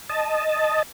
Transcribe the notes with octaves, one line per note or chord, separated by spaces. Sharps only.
D#5 A5